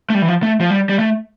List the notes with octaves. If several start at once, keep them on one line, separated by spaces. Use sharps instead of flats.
A3
G3
E3
F3
A3
F3
G3
G3
A3